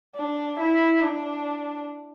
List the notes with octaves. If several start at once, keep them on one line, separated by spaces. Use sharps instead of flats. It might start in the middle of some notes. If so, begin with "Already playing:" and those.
D4
E4
D4